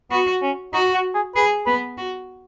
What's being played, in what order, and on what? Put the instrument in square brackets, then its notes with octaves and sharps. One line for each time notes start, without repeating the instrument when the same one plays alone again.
[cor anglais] B3 [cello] F#4
[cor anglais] C#4
[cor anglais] D#4 [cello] F#4
[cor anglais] F#4
G#4
[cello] G#4 [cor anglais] B4
[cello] B3 [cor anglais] B4
[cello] F#4